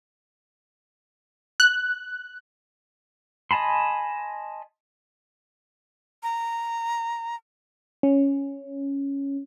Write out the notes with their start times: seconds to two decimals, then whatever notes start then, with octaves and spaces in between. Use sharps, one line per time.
1.60 F#6
3.51 D#5 G#5 A5 B5 C6
6.23 A#5
8.03 C#4